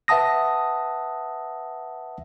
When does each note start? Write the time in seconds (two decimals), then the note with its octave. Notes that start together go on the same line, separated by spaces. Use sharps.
0.08 B4 E5 F#5 A5 D#6 A#6